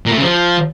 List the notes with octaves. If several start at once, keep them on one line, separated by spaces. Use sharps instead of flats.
A#2
A3
C#3
F3